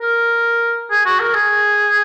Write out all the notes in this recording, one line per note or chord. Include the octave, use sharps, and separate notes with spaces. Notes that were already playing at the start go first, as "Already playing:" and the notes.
A#4
G#4
F#4
A#4
G#4